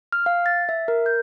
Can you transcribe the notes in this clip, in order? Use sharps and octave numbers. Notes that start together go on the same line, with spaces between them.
F6
F5
A6
E5
A#4
G6